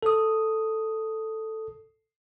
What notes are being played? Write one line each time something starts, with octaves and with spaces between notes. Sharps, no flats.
A4 D#6